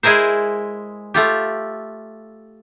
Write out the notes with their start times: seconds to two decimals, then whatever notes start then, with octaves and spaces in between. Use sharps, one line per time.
0.03 G#3 E4 G#4 A#4 C5
1.14 A3 F4 G4